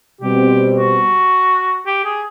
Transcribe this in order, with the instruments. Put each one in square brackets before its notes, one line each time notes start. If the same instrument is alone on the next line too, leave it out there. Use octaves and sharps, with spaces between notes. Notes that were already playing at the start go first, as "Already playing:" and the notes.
[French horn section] B2 G3 C4 [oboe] G4
[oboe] F#4
G4
G#4